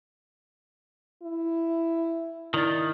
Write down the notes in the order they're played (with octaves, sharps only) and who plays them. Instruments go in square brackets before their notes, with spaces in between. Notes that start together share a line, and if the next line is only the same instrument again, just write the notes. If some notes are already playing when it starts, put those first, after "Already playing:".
[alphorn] E4
[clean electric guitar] D#3 [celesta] E4 D5 A6